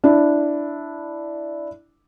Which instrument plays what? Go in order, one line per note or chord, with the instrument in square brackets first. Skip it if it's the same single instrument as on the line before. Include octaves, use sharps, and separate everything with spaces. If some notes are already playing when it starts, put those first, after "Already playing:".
[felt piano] D4 E4